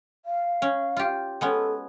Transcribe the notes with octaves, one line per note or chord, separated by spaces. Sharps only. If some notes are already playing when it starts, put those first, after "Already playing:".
F5
C#4
F4 G4
G#3 B3 C#4 A4